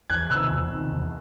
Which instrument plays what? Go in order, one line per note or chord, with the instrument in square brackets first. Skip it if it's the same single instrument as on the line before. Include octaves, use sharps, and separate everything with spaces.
[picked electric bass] E2 [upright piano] F#6 G#6
[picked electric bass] C3 D#3 [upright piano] E6 F#6
[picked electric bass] E2
C3 D#3
E2